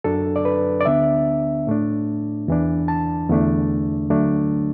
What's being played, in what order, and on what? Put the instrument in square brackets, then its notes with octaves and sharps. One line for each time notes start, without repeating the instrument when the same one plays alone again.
[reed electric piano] F#2 F#3 D4 A4
D5
B4
D5
D2 D3 B3 D4 E5
A2 A3 D4
E2 E3 D4
A5
E2 D3 A3 D4
D2 D3 F#3 A3 D4